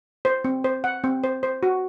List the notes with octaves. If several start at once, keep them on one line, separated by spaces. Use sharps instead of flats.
C5
C4
C5
F#5
C4
C5
C5
F#4